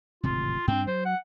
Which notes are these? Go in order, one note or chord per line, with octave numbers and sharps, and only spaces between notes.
D1 G#1 C3 F4
G2 C4 D4
F#3 C5
F#5